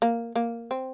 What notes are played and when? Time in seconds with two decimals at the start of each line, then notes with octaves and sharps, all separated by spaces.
0.02 A#3
0.36 A#3
0.71 C4